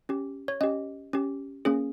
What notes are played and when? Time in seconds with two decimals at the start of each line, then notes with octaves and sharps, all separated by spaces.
0.09 C#4 G4
0.48 C#5
0.61 C#4 G4 D#5
1.13 C#4 G4
1.65 A#3 C#4 G#4